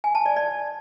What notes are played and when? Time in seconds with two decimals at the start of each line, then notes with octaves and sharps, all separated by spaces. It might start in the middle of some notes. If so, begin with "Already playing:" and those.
0.04 G#5
0.15 A5
0.26 D5
0.37 D5